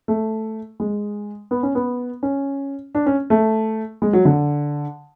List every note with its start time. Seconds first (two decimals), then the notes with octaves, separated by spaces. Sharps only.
0.08 A3
0.80 G#3
1.51 B3
1.63 C#4
1.75 B3
2.23 C#4
2.95 D4
3.06 C#4
3.30 A3
4.02 G#3
4.13 F#3
4.25 D3